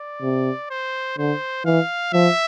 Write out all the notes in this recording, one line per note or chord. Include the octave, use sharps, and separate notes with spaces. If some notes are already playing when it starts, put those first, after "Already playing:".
Already playing: D5
C3
C5
D3 C5
E3 F5
F3 E5